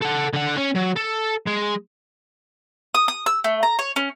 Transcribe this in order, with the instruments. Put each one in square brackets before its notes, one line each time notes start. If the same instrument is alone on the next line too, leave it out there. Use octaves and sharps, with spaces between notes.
[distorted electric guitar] A4 F#5
D3 F#5
C#4
F#3
A4
G#3
[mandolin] D#6
D#6
E6
A3
A#5
C#5
C#4